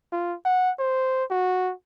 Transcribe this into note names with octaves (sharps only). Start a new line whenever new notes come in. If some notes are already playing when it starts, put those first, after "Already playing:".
F4
F#5
C5
F#4